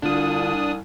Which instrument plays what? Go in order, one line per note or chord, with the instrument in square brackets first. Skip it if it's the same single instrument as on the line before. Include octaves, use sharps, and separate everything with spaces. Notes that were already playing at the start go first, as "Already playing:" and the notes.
[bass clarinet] C2 [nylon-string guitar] D3 F4 [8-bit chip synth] D4 D#6